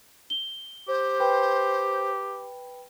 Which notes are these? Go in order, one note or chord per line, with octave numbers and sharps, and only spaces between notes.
G7
G4 C5
B4 G5 B5